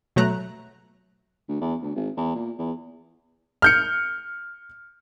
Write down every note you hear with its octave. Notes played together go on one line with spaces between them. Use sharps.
B2 F#3 A3 A#5 F#6
D2
E2
D2
G#1
E2
A#2
E2
F6 G6 C#7